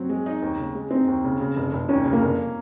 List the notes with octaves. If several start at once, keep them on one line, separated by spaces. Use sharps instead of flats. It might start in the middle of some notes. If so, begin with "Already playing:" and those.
Already playing: F#3 C4
G#3
D#4
D#2
C#3
G#3
C4 D#4
D#2
C#3
C#3
F1
F1
D#2 C#4
C#3
A#3
F1